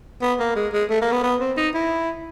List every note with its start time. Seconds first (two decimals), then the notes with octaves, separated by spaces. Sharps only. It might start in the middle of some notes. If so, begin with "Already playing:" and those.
0.22 B3
0.40 A#3
0.56 G#3
0.73 G#3
0.90 A3
1.02 A#3
1.12 B3
1.24 B3
1.41 C4
1.57 D#4
1.75 E4